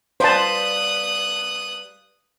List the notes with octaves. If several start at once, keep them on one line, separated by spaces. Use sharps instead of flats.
G3 B4 C5 F5 A5 D#6 F#6